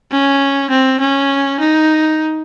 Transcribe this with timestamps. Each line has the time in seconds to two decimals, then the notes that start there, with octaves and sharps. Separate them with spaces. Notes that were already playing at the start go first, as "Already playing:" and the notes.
0.11 C#4
0.70 C4
1.00 C#4
1.60 D#4